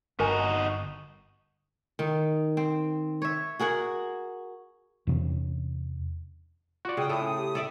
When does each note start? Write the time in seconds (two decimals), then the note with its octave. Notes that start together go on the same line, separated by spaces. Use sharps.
0.20 G1 D#4 F#4 A#4 G#5
1.99 D#3 D#4
2.57 C4
3.22 C#5 E5
3.60 F#4 G#4 A#4 F#5
5.07 E2 C3 C#4
6.85 F4 F#4 D5
6.97 C#3 G5 D#6
7.09 A2 A4 D#6
7.21 C#4
7.38 G4
7.55 A4 D5 E5